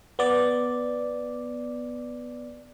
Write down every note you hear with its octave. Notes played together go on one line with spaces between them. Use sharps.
B3 D5